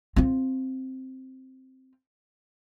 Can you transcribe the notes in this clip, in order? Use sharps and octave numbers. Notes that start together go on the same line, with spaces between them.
C4 F4